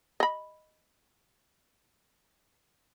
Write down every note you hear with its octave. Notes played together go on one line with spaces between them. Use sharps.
D#5 B5